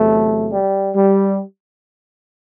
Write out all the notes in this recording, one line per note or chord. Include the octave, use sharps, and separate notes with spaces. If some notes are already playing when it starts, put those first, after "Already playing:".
Already playing: E2 C3 F#3 A3
G3
G3